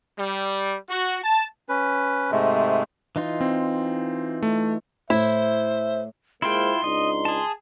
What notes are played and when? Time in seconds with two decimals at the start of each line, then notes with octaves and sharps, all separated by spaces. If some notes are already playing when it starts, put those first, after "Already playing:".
0.18 G3
0.89 F#4
1.22 A5
1.69 C#4 B4
2.31 G#2 C3 G#3 A3
3.16 E3 D#4 F4
3.41 C4
4.43 A3
5.10 A2 E4 C5 E5
6.42 G#3 A#3 E4 F4 C5 G5 C6
6.84 C#2 D4 D#4 D#5
7.25 G#4 A5